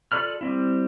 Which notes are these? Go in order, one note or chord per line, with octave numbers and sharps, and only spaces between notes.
F4 A4 D5 B5 F6
G3 C4 E4